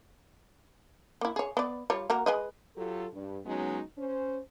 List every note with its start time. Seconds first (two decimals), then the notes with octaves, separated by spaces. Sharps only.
1.21 A#3 E4
1.36 G#4 C#5
1.57 B3 D5
1.90 G3 F4 C#5
2.10 A#3 F#4 A#4
2.26 G#3 B4 D#5
2.76 F#3 F4 G4 A4
3.13 G2
3.45 F#3 G#3 B3 C#4 D#4 F#4
3.97 C#4 C5